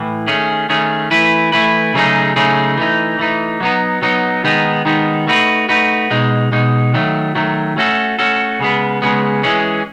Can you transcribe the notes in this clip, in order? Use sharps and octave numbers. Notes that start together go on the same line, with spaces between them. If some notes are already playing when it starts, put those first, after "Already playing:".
Already playing: A2 E3
D#3 A3 C#4 G#4
D#3 A3 C#4 G#4
E3 A3 E4 B4
E3 A3 E4 B4
C#3 F#3 A3 D#4 G#4
C#3 F#3 A3 D#4 G#4
E3 A3 D#4
E3 A3 D#4
F#3 B3 D#4
F#3 B3 D#4
D#3 G#3 B3 D#4
D#3 G#3 B3 D#4
A3 D#4 F#4 B4
A3 D#4 F#4 B4
B2 G#3 D#4
B2 G#3 D#4
D#3 F#3 A3
D#3 F#3 A3
A3 C#4 F#4 A4
A3 C#4 F#4 A4
C#3 G#3 B3
C#3 G#3 B3
E3 G#3 C#4 G#4